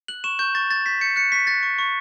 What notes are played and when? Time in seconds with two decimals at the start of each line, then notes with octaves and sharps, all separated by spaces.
0.08 F#6 F#7
0.24 C#6 E7
0.39 C#6 G6
0.55 C#6 A6
0.70 G6 A6
0.86 G6 B6
1.01 G6 C#7
1.16 F#6 C#7
1.32 C#6 B6
1.47 F#6 A6
1.63 C#6
1.79 C#6